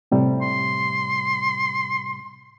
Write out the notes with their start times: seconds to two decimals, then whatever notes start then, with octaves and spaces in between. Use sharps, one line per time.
0.12 A2 C3 G3
0.42 C6